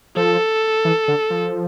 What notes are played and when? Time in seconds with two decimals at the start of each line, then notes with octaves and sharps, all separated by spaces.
0.16 F3 A4
0.85 E3
1.08 D3
1.30 F3